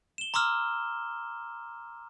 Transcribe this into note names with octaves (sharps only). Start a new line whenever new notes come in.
E7 G7
A#5 C6 D6 E6 F6